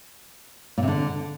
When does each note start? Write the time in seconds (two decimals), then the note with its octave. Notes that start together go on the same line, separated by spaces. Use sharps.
0.78 A#2
0.83 C3
0.88 D3